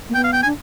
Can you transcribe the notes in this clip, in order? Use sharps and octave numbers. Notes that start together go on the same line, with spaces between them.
A#3
B3 G5
F5
G5
G#5
D4